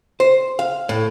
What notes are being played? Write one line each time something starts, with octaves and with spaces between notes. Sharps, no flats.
C5
F5
A2